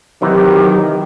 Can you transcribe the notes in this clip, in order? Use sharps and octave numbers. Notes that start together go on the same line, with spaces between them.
C3 D#3 E3 F#3 D#4 G4